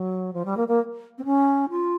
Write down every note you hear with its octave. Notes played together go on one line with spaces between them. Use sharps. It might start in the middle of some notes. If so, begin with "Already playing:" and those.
Already playing: F#3
F3
G3
A#3
A#3
C4
C#4
F4